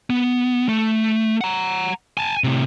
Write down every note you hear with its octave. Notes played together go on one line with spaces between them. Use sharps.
B3
A3
F#5 A#5
G#5 A5
A2 C3